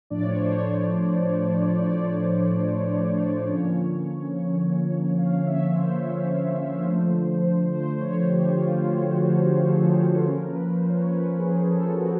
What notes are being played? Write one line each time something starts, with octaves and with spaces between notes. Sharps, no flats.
A2 F3 A3 D4 D5
C#5
C5
C#5
D5
D3 F3 A#3 C#4 C#5
F5
E5
C5
D3 F3 A3
C5
C#5
G4
F4
G4
F#4
F#4
A4
G#4
A4
B4
F3 A#3 C#4 A#4
B4
C5
C#5
B4
G#4
A4
F#4